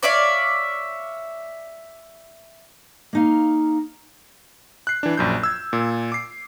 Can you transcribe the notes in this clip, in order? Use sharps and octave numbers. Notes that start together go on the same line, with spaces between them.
C#5 D5 E5 F5
A#3 D#4 F5
F#6 C7
E3 D4
A#1 F#2 G6
E6 G#6
A#2
D6 C7